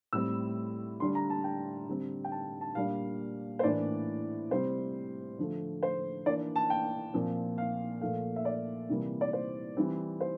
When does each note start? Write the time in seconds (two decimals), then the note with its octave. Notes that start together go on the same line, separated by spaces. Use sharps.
0.13 A2 G3 C4 E6
1.00 D3 G3 D4 C6
1.15 A#5
1.30 A5
1.44 G5
1.88 D3 G3 C4
2.24 G5
2.32 A5
2.61 A5
2.75 A#2 G3 D4 F5
3.59 C5
3.63 A2 E3 A#3 D4 D5
4.50 C3 G3 C4 C5
5.39 D3 F3 A3
5.83 C5
6.26 E3 A#3 D4 D5
6.56 A5
6.70 G5
7.14 A#2 F3 C4
7.58 F5
8.01 A#2 F3 A3 F5
8.36 E5
8.45 D5
8.89 C3 E3 G3 A#3
9.21 D5
9.33 C5
9.77 E3 G3 C4
10.21 C5